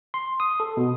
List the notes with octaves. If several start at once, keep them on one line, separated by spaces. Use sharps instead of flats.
C6
D#6
A4
B2